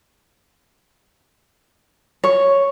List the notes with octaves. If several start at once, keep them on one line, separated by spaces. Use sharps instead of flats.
C#5